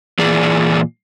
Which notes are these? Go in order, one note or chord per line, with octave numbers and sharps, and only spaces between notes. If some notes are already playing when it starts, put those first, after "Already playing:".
A#2 E3 G#4 D5